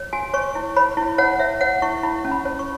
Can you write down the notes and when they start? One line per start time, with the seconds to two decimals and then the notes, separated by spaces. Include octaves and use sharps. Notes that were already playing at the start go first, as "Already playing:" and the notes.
Already playing: C#5
0.13 F#4 G#5
0.34 C#5 C#6
0.55 E4
0.76 C#5 B5
0.97 E4
1.18 C#5 F#5
1.39 C#5 E5
1.61 C#5 F#5
1.82 E4 C#6
2.03 E4 B5
2.25 C#4
2.31 B5
2.45 C#5
2.59 C#6